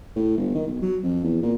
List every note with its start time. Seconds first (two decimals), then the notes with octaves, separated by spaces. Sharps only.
0.16 A2
0.37 G1
0.55 D#3
0.67 B1
0.82 F#3
1.03 F2
1.24 E2
1.42 A#2